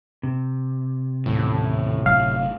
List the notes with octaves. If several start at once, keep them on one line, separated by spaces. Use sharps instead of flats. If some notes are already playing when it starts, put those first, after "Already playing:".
C3
D#1 A2 E3
G1 F#3 A3 F5